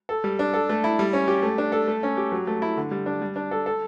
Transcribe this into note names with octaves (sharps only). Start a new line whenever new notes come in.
A4
G3
D4
A4
A3
E4
G3
C#4
G4
A3
D4
A4
A3
C#4
G4
F#3
A3
E4
D3
G3
D4
G3
D4
A4
A4